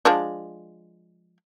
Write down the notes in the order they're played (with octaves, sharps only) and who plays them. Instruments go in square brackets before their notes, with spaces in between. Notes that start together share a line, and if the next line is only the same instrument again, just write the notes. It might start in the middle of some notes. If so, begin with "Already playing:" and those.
[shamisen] F3 G#3 D4